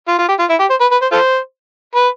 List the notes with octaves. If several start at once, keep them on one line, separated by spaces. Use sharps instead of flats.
F4
F4
G4
F4
E4
G4
C5
B4
B4
C5
F4 A4 C5
B4